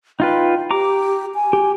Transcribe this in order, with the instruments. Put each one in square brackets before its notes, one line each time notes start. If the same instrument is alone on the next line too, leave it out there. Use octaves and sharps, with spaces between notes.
[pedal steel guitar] D#4 F4 B4 [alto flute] G5
[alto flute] G4 [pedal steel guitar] A#5 D6
[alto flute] G#5
[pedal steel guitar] G4